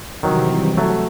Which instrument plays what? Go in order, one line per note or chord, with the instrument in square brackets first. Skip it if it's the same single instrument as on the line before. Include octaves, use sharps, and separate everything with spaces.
[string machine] C3 E3 G3 C4 [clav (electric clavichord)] D#3 F#3
[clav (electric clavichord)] F#3 A3